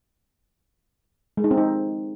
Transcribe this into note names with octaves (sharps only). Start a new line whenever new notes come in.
G#3
D#4
C4
D#4